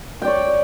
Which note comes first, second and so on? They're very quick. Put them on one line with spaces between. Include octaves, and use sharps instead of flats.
G5 D5 C#5